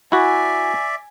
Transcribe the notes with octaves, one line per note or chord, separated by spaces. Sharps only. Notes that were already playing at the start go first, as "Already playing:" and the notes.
E4 F#4 D5 E5 G#5